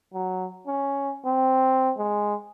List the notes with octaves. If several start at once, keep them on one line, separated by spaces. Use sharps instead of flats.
F#3
C#4
C4
G#3